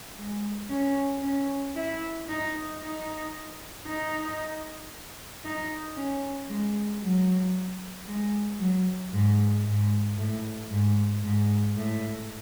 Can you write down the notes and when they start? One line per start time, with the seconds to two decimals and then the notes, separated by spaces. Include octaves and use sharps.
0.18 G#3
0.69 C#4
1.22 C#4
1.75 E4
2.28 D#4
2.81 D#4
3.86 D#4
5.45 D#4
5.96 C#4
6.49 G#3
7.02 F#3
8.07 G#3
8.59 F#3
9.13 G#2
9.65 G#2
10.18 A2
10.71 G#2
11.23 G#2
11.76 A2